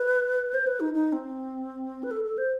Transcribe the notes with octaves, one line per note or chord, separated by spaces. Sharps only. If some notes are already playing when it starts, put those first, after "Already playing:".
Already playing: B4
C5
B4
D#4
D#4
C4
B4
A4
A4
C5